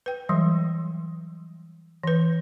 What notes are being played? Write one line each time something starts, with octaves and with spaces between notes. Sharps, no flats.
B4 G5
E3 F#3 G3
E3 B4